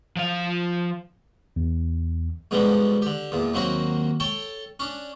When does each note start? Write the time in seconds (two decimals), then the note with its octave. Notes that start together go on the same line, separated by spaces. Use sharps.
0.17 F3 F5
1.56 E2
2.51 G#2 B2 D3 E3 F3 G3
3.02 D3 G4
3.32 E2 A#2
3.54 D#2 F#3 A#3 C4 F#4
4.20 A4 C#5 G5 A5
4.80 C#4 D4